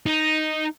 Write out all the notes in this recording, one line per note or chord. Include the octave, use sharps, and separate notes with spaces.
D#4